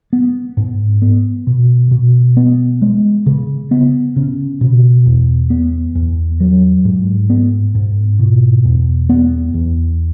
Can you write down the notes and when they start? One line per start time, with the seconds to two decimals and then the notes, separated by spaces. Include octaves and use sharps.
0.13 B3
0.57 G#2
1.02 B3
1.47 B2
1.91 B2
2.37 B3
2.82 G#3
3.26 C#3
3.71 B3
4.16 C#3
4.61 B2
5.06 E2
5.50 B3
5.95 E2
6.40 F#3
6.85 G#2
7.30 B3
7.75 G#2
8.19 B2
8.65 E2
9.09 B3
9.54 E2